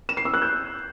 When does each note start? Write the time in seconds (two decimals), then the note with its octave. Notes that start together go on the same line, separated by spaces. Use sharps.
0.09 E7
0.17 C7
0.25 E6
0.34 F#6
0.42 G6